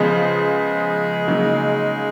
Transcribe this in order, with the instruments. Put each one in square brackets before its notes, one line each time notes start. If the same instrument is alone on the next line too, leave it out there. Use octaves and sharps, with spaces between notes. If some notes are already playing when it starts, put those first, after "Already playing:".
Already playing: [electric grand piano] C#3 F3 B3 [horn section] G#3
[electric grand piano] C#3 F#3 A#3 D#4